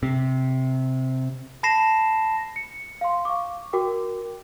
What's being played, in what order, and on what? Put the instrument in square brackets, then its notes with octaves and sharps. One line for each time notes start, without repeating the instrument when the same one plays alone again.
[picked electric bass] C3
[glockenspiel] A5 B5 A#6 C7 E7
[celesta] C#7
F5 C6
F5 C#6 D6
F#4 A#4 G5 D6